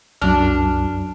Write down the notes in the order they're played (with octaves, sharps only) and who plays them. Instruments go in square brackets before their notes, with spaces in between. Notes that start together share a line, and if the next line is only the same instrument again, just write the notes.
[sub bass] C2 [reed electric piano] F#2 F6 [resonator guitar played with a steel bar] D4